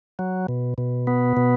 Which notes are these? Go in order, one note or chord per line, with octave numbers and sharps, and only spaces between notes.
F#3
B2
B2
B3
B2